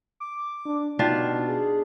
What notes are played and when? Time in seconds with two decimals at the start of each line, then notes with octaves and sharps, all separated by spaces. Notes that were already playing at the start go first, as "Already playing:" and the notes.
0.20 D6
0.65 D4
0.99 B2 D4 D#4 F4 G4
1.49 G#4